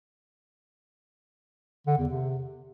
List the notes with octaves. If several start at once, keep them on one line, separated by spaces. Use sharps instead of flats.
D3
E2
C3